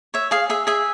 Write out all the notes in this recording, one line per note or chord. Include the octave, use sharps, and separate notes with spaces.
C#5 E5
G#4 F5
G#4 E5
G#4 E5